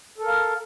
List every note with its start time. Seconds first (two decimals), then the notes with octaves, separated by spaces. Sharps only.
0.18 A4
0.23 A#4
0.28 F5